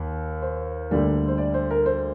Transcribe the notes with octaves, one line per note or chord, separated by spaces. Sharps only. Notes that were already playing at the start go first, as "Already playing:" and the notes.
Already playing: D#2
C5
D2 D3 G3 A#3
C5
D5
C5
A#4
C5